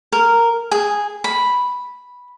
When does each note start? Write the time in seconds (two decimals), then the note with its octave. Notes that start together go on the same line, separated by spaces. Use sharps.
0.12 A#4
0.71 G#4
1.24 B5